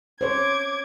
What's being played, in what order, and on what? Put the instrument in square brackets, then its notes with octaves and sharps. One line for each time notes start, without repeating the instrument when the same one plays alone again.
[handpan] C5 C#5 [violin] D6 G#6